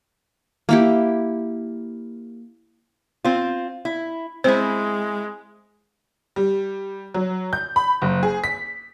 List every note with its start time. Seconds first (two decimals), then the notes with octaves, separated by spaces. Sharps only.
0.69 A#3 E4 G4
3.24 C4 F4
3.85 E4
4.44 G#3 C4 E4 C5
6.36 G3
7.14 F#3
7.53 G6
7.76 B5
8.02 F#1
8.23 G#4
8.44 B6